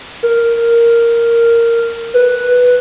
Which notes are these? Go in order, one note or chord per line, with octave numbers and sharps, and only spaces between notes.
A#4
B4